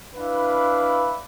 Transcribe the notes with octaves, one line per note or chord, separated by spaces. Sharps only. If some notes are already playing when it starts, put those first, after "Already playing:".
D4 E4 B4 F5 B5